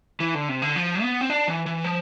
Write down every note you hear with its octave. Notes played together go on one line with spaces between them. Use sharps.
E3
D3
C3
D3
F3
B3
C4
D4
E3
E3
F3